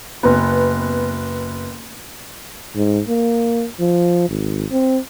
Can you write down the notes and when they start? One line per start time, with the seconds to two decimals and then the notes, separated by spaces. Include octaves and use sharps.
0.23 F#1 B3
2.76 G#2
3.09 A#3
3.80 F3
4.29 G#1
4.71 C4